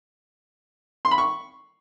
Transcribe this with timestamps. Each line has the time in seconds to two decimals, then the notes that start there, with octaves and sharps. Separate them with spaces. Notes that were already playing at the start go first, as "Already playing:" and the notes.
1.05 C6
1.11 B5
1.18 C#6